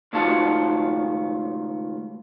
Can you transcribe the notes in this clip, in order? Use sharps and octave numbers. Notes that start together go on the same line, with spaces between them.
C#2 A2 D#3 F4 F#4 A5